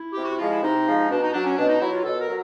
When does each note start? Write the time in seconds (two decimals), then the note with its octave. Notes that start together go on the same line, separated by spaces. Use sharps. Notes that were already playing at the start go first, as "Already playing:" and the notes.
Already playing: E4
0.13 C3 G4
0.25 F#4
0.37 F3 G#3 F4
0.51 E4
0.62 C3 D#4
0.87 F3 G#3
1.09 B2 D4
1.22 D#4
1.33 F#3 D4
1.45 C#4
1.58 B2 D4
1.69 D#4
1.80 F#3 E4
1.92 F4
2.04 B2 A4
2.20 A#4
2.27 F#3